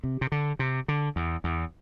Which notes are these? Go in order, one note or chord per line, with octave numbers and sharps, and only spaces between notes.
C3
C3
D3
C3
D3
E2
E2